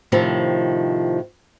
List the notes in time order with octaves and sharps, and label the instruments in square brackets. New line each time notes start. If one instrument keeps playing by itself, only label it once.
[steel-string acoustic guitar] A2 C3 D#3 F3